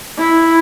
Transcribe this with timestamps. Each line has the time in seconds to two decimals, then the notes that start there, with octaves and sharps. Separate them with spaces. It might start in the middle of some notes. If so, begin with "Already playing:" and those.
0.18 E4